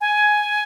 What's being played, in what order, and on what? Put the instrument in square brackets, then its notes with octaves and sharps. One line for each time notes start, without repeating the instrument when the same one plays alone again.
[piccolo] G#5